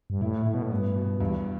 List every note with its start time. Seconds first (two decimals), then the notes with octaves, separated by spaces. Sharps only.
0.10 G2
0.21 A2 E4
0.46 A2 E4
0.54 B2
0.63 A2
0.71 G2 B3
0.96 B2
1.20 E2 G2